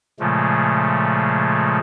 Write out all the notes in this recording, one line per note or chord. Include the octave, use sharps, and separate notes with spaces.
A#2 C#3 F3 G#3 A3